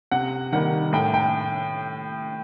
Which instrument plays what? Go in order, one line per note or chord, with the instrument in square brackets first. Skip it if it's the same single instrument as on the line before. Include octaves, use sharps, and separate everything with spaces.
[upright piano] C3 F#5
D#3 G3 A#3 F#5
A2 G5
G5